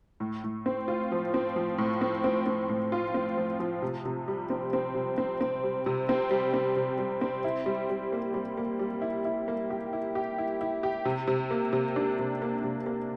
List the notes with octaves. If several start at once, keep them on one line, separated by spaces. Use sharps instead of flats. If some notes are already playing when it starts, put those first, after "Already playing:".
A2
A2
C4
F4
F3
C4
F3
A2
C4
C4
C4
A2
F4
C4
F3
F3
C3
C3
G3
C4
C4
C3
C4
C4
G3
C3
C4
G3
C4
C3
G3
C4
E4
G3
G3
A#3
G3
A#3
G3
E4
E4
A#3
G4
E4
G4
E4
E4
G4
C3
C3
A#3
C3
D4
C3
A#3
C3
A#3